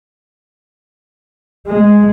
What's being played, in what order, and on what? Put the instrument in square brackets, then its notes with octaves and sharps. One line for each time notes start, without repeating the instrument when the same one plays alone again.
[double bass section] G#3